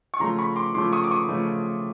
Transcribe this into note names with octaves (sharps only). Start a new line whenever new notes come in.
C#6
C#3 F3 A3 A#5 C6
B5 C#6
C6 D6
C#3 F3 A3 C6 D6
C#6 D#6
D6
C#6 D#6
C#3 F3 A3